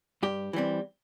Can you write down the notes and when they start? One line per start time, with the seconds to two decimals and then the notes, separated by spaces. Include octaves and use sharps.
0.23 G2 G4
0.53 E3 G3 C4